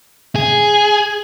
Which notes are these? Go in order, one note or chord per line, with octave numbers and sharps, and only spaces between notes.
G#4